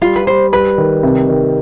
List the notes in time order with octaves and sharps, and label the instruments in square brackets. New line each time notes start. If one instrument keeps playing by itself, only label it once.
[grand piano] G3 [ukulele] F4
[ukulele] B4
[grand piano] G3 [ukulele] C5
[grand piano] G3 [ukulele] B4
[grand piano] D#3
C3
D#3